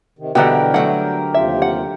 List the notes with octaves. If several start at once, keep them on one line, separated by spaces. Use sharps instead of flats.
C3 D#3
B2 D3 E3 G3 G4 A#4 F#5 G5
F#3 A3 F#5
D#2 C3 F4 E5
F#5